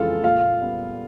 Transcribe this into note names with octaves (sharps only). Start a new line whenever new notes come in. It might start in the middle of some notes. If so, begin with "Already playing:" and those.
Already playing: F2 C#3 E3 G#3 F4 A4 F5
A#2 F4 F5
G3 B3